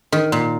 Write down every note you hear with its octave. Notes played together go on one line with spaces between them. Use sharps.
D#3
A#2